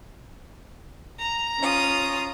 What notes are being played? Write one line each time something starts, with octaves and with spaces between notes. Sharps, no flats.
A#5
C#4 F4 D#6